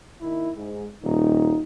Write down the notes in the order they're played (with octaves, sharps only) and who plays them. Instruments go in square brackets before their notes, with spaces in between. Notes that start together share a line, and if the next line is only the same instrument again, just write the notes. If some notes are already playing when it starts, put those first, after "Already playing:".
[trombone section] D#2 D#3 E4
G#2
[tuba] D#1 [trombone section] D#4